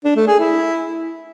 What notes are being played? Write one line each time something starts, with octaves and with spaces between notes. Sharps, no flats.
D4
A3
G#4
E4